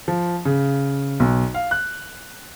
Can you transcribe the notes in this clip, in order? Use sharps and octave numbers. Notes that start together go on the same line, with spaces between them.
F3
C#3
B1
F5
F#6